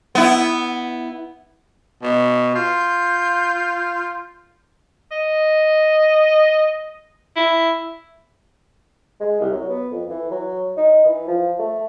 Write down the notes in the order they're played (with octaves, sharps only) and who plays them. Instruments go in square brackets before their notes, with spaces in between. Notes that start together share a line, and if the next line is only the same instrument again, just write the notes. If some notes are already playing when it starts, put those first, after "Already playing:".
[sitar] B3 E4
[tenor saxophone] B2
[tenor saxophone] F4 [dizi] G6
[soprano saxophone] D#5
E4
[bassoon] G#3
C2
F#3
B3
F2
E3
F#3
D#4
E3
F3
A3